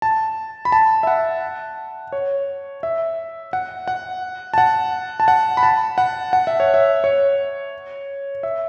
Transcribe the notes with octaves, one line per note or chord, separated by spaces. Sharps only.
A5
B5
A5
E5
F#5
C#5
E5
F#5
F#5
A5
F#5
A5
F#5
B5
A5
F#5
F#5
E5
C#5
E5
C#5
E5